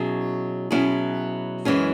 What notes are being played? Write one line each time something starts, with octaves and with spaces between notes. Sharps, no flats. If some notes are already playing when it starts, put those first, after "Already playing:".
Already playing: B2 F#3 C#4 E4 G#4
B2 F#3 C#4 E4 G#4
F#2 E3 G#3 C#4 G#4